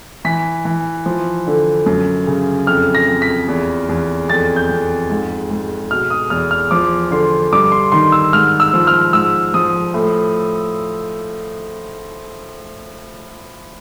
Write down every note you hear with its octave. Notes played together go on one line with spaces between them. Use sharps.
E3 B6
E3
F3
D3
F#2
C#3
F2 F6
A#6
F2
B6
E2
E2
F2 A6
G6
F2
G#2
G#2
B2 F6
D#6
E2 F6
F6
F3 D6
D3 C6
G2 D6
C6
D#3 C6
E6
G#2 F6
E6
F3
F6
G#2 E6
F3 D#6
A2